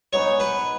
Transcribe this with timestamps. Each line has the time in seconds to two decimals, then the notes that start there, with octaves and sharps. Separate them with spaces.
0.13 G#3 B3 D#4 G#4 C#5
0.40 B4